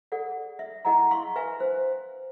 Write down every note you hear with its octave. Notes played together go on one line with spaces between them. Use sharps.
G#4 A4 D5 F#5
E5
E4 G#4 D#5 F#5 A#5
F5 C6 C#6
B4 E5 F5 G#5
C5